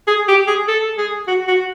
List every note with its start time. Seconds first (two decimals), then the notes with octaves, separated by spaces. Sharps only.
0.07 G#4
0.28 G4
0.47 G#4
0.68 A4
0.98 G#4
1.27 F#4
1.48 F#4